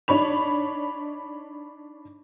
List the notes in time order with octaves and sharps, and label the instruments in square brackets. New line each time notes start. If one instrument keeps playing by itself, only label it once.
[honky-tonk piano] D4 D#4 C#5 B5 F7